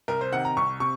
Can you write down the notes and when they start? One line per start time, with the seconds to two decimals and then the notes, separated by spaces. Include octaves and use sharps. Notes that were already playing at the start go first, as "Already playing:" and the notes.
0.08 C2 A#4
0.21 C5
0.32 C3 D#3 F#5
0.45 A#5
0.57 C2 C#6
0.80 C3 C#6